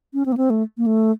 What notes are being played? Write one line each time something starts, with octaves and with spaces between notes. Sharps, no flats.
C#4
C4
A#3
C4
A3
A#3
A3